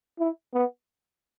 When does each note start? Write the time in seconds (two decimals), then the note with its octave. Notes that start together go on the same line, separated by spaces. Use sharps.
0.19 E4
0.53 B3